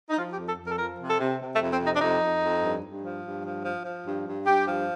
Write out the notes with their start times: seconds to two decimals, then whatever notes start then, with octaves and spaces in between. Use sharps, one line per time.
0.10 D#4
0.18 F3 F4
0.33 G4
0.38 F2
0.49 A4
0.59 F2
0.65 A#4
0.71 A4
0.79 F3 A#4
0.99 C3
1.09 A4
1.20 C3
1.41 C3
1.56 A3
1.61 F2
1.71 C4
1.82 C3
1.87 D#4
1.96 D4
2.01 F2 D#4
2.22 F2
2.43 F2
2.62 G2
2.84 G2
3.03 F3
3.24 G2
3.45 F3
3.65 F3
3.85 F3
4.05 G2
4.26 G2
4.47 G2 G4
4.68 F3